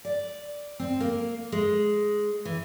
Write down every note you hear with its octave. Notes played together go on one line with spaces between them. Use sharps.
D5
C4
A#3
G#3
E3